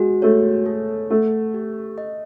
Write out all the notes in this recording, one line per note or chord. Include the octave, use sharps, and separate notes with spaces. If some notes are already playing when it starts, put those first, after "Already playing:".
Already playing: G#3 F#4
A3 C#5
A4
A3 F#5
G4
D#5